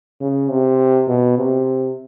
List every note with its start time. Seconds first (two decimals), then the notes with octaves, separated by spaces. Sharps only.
0.20 C#3
0.50 C3
1.08 B2
1.38 C3